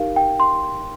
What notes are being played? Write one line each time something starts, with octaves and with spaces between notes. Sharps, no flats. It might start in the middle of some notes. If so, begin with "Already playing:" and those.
Already playing: D#4 G4 A#4 F5
G5
C6